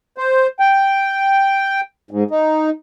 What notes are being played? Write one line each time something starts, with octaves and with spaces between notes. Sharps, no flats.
C5
G5
G#2
D#4